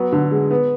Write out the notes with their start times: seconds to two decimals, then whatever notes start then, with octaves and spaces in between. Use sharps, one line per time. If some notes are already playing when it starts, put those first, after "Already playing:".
Already playing: F#3 B3
0.12 D3
0.31 G#3
0.51 B3